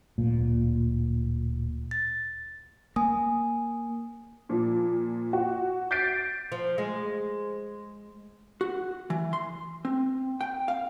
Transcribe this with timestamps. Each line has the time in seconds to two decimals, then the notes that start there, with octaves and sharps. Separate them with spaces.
0.18 D1 A#2
1.91 A6
2.96 A#3 G#5 D#6
4.49 A#2 F3
5.33 F#4
5.91 G6 A6 B6 C7 D7
6.52 F3
6.78 G#3
8.61 F#4
9.10 E3
9.33 C6
9.85 C4
10.41 G5
10.68 F5